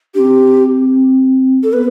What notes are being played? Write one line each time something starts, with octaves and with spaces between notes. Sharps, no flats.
C4 D4 G4
A4
B3 B4